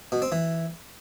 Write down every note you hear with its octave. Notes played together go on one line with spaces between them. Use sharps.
B2
C4
E3